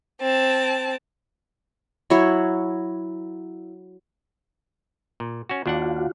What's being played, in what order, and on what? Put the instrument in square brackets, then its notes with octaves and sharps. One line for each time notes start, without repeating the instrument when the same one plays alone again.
[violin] C4 A5
[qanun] F#3 E4 C#5
[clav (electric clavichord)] A#2
C#4 F#4
[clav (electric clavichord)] D#2 D4 F#5 [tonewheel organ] F4 F#4